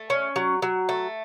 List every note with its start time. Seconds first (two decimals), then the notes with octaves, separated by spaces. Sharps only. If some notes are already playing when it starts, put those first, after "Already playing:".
Already playing: A3
0.10 C#4
0.36 F#3
0.62 F#3
0.89 A3